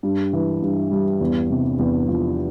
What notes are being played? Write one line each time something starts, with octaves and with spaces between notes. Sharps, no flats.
G2
E3
G2
G3
E2
C3
E2
F3